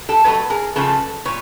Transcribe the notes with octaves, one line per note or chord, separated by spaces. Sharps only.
G4 A4
B2 F#3 A3 A4 B4
G#4 A#4
C#3 F3 A3 A4 B4
A#2 B4 C#5